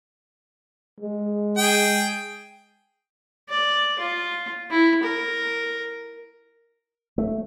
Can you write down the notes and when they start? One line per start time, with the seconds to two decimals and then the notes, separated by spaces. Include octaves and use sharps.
1.00 G#3
1.58 G#4 G5
3.49 D5
3.99 F4
4.71 E4
5.03 A#4
7.18 A3